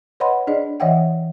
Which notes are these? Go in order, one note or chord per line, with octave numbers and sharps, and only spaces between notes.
B4 C#5 D#5 F#5 B5 C6
D4 G#4 D5 D#5
E3 C#5 D#5 E5 F#5 G5